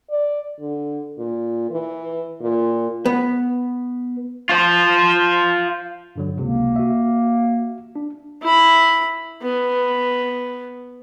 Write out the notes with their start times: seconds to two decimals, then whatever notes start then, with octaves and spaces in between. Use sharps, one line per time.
0.10 D5
0.60 D3
1.18 A#2
1.71 E3
2.41 A#2
3.06 B3
4.49 F4 C5
6.16 G2 D3 F#3
6.39 G#1 C#2 C3 A#3
6.76 F#4 E5
7.96 D4
8.42 E4 B5
9.42 B3